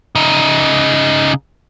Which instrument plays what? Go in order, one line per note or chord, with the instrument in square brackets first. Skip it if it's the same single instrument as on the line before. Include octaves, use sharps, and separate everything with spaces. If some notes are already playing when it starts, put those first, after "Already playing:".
[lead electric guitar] C#3 D#4